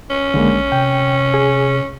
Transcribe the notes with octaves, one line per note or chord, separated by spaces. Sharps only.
C#4
A#1 D3 G#3 A#3
C3 G5
G#4